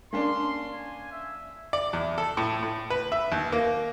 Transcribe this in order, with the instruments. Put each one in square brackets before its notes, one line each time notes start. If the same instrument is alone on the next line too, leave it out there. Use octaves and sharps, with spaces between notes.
[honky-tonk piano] A#3 C#4 D4 [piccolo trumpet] C6
[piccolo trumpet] G#5
E5
[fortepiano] D5
E2
A4
A2
A2
B4
E5
D#2
A#3